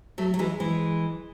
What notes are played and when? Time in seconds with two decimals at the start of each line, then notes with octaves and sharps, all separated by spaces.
0.18 F#3 A3
0.34 F#3
0.39 E3 G#3
0.60 E3 G#3